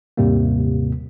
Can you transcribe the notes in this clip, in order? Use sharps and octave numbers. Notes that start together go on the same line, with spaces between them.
D#2 G#2 C3 G3 A#3